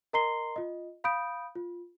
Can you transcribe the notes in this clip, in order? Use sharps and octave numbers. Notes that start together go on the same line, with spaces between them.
A#4 D#5 A#5 C6 C7 G7
F4 D#5
F5 B5 D#6 G6 D7
F4